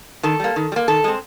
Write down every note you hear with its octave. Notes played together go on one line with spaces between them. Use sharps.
D#3 A4
G3 A#3
D#3
G3
A#3
D#3 A4
G#3 C4